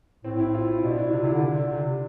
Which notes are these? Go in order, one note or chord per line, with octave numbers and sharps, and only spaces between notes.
A2 C4
E4
F4
E4
B2 D4
E4
C3 F4
C3
E4
D3
D4
C3